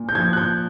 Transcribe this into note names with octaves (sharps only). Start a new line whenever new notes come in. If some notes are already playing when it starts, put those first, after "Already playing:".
Already playing: A#2
G6
F3 G#6
F#6
G6